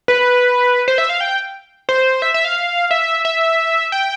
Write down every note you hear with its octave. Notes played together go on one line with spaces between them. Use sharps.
B4
C5
E5
F5
G5
C5
E5
E5
F5
E5
E5
G5